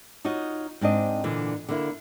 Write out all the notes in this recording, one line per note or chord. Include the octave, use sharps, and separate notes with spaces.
D#4 F4 F#4 C#5 D#5
G#2 C4 D4 D#5
A#2 D3 E3
D3 A#3 E4